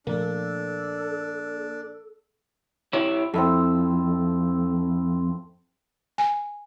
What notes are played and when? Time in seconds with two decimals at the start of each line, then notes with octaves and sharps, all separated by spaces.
0.07 A#2 F3 A3 A#3 D4 A4
2.93 E4 G4 C#5
3.34 F2 C4 E4 A4
6.18 G#5